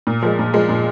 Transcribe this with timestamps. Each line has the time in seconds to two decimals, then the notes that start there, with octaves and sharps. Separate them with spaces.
0.07 A#2
0.23 F3 G#3
0.39 A#2
0.54 F3 G#3
0.69 A#2